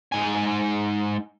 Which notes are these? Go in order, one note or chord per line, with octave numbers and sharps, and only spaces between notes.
G#2 G#5